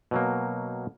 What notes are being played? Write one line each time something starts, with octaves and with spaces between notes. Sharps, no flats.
B2 F#3 A#3